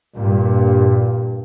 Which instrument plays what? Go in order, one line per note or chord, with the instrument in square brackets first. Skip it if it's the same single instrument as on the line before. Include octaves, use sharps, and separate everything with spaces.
[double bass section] G2 A#2